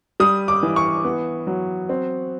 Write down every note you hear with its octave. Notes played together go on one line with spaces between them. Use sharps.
G3 D#6
D6
E3
C#6
B3
F#3
C4